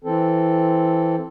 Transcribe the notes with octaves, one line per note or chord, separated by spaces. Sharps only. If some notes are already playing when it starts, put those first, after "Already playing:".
E3 C4 A4